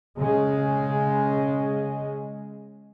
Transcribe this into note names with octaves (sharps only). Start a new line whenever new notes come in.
C#3 G#3